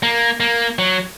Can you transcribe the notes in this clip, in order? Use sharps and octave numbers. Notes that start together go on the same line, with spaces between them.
A#3
A#3
F#3